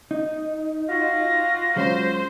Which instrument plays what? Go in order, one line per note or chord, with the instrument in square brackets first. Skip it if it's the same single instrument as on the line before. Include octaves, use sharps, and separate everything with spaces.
[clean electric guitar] D#4
[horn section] F4 F#4 [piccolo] A#6
[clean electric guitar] F#3 G#3 C#4 [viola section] C5